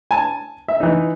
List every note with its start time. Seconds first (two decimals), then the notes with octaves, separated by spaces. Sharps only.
0.11 G#5 A5
0.68 E5
0.80 E3 D#4